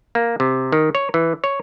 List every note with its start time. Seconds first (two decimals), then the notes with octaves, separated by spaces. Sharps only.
0.15 A#3
0.40 C3
0.72 D#3
0.95 C#5
1.14 E3
1.44 C#5